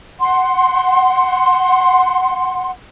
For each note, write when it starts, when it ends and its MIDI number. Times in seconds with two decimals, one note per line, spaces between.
0.19 2.70 78
0.19 2.70 84